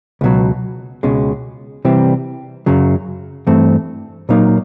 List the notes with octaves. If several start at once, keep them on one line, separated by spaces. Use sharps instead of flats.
C#2 B2 F#3
C#2 B2 G#3 C#4
C3 E3 G3 C4
F#2 C#3 F#3
G2 E3 A3 C4
A#2 F#3 A#3 D#4